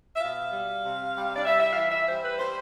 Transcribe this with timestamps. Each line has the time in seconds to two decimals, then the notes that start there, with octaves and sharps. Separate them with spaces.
0.15 E5
0.20 B2 F5
0.52 G3
0.83 C3
1.14 G3
1.36 D5
1.45 G3 E5
1.60 E5
1.71 F5
1.76 E3 E5
1.91 E5
2.07 G3 C5
2.23 B4
2.38 G3 C5